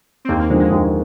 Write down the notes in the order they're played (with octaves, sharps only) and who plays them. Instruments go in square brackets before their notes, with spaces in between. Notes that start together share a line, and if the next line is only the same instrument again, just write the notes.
[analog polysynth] C4
[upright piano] D#2 [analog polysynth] A#3
[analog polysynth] A#3
[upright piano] D3 F3 C4 [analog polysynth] G#3
[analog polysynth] G#3
[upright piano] D#2